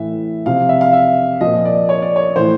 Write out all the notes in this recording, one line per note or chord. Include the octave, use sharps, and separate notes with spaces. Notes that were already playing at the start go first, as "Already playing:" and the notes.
Already playing: A2 E3 E5
C3 F3 F5
E5
F5
E5
A#2 F3 D#5
D5
C#5
D5
C#5
A2 E3 C5